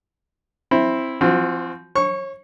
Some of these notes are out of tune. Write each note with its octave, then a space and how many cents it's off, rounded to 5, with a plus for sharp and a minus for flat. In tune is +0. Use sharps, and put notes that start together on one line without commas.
C4 +10 E4 +0
F3 -35 C4 +0 F#4 -40
C#5 -35 C#6 +0